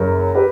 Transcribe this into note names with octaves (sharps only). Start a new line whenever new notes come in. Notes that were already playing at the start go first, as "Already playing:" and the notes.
Already playing: F#1 F#2 A#4
G4 B4